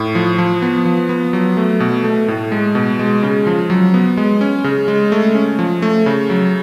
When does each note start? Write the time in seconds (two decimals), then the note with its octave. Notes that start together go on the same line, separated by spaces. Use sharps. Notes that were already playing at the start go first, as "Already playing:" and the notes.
Already playing: A2
0.15 F3
0.38 F3
0.62 B3
0.85 F3
1.09 B3
1.33 F#3
1.57 A3
1.80 B2
2.04 A3
2.28 A2
2.52 G#3
2.75 B2
2.99 G#3
3.23 C#3
3.47 F3
3.70 F#3
3.94 B3
4.17 G#3
4.41 C#4
4.64 C#3
4.88 G#3
5.12 A3
5.35 C#4
5.59 F3
5.82 A3
6.06 C#3
6.30 F#3